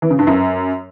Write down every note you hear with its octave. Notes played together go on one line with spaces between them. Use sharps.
E3
C#3
G2
F#2